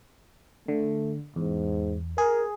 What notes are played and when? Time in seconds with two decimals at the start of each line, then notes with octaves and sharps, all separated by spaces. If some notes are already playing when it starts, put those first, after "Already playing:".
0.68 D3 A3
1.36 E2 G#2
2.18 G#4 A#4